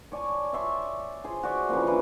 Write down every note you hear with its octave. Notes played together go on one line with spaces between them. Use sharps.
C#5 D5 G#5 A5
D5 E5 C6 C#6
G#4 C5
F#4 D5 E5
C#3 E3 F3 A#3
E3 D4